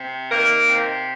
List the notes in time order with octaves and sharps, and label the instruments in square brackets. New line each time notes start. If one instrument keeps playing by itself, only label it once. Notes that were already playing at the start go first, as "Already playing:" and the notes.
Already playing: [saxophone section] C3
D#3 A#3 A#4
C3